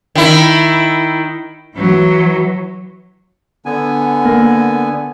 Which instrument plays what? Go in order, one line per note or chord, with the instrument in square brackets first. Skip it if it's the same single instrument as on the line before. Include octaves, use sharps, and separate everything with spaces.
[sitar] D#3 E4
[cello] E3 F#3
[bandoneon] D3 B3 G#5
[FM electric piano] A#3